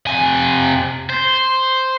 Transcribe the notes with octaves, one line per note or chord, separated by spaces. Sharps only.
C3 G#5
C5